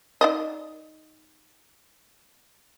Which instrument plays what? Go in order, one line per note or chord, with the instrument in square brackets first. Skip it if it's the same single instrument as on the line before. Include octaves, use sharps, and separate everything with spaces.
[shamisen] D#4 D5 D#5